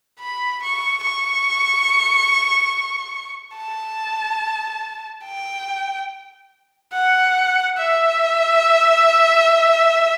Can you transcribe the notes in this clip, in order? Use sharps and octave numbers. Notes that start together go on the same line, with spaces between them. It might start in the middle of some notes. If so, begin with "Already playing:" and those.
B5
C#6
C#6
A5
G5
F#5
E5